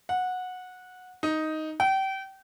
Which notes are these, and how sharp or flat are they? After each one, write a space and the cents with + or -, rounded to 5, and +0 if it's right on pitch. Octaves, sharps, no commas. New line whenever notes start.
F#5 -15
D#4 +5
G5 -30